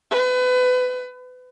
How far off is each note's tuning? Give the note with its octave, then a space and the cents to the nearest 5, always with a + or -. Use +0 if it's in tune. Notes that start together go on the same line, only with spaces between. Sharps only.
B4 +30